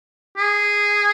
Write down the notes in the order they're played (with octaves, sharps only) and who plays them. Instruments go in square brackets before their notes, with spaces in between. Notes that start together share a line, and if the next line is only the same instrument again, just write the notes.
[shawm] G#4